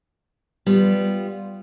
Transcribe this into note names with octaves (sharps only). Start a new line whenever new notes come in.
G3 B3 F4